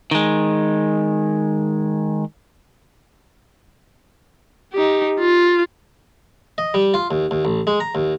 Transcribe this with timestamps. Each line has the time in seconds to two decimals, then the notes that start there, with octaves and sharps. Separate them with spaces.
0.11 D#3 G#3
4.73 D#4 G4
5.19 F4
6.58 D#5
6.74 G3
6.94 F4
7.11 D#2
7.31 D#2
7.45 A1
7.67 G#3
7.80 A#5
7.95 D#2